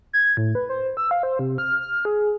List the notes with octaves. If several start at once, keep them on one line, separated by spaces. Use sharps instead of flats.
G#6
A2
B4
C5
E6
F5
C5
C3
F6
F6
G#4